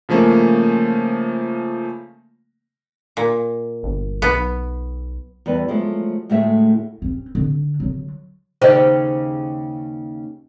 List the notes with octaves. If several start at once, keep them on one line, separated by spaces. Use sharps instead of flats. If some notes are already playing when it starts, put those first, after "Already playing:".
C#3 F3 A3 A#3 C#4
A#2
G1
B1 B3
E2 G3 B3 B4
F3 F#3 G#3 A3
D2 A2 G#3 A3 G#4 E5
C4 C#4
D3
D3 F#3
D#2 C#3 G4 C5 D#5